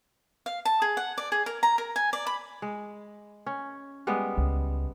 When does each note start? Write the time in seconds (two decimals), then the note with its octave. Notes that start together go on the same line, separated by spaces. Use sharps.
0.46 F5
0.65 A5
0.82 G#4
0.97 F#5
1.18 D5
1.32 G#4
1.46 A#4
1.63 A#5
1.78 A#4
1.96 G#5
2.13 D5
2.27 B5
2.62 G#3
3.46 C#4
4.07 G3 G#3 B3
4.37 C#2